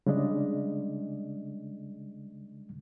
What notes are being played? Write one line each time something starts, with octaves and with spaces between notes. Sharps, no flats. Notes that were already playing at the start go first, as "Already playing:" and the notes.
C#3 G3 G#3 D4 D5 D#5